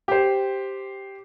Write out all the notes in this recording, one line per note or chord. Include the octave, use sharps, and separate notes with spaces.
G4 C5